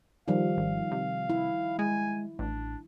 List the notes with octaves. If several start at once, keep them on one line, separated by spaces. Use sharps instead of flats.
D#3 F3 G3 F5
G#1
C3
E4
G#3 G#5
A1 D4